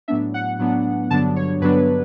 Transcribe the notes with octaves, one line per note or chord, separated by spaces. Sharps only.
A2 F#3 B3 D4 E5
F#5
A2 F#3 B3 D4
G2 D3 F#3 B3 D4 A5
C#5
G2 D3 F#3 B3 D4 B4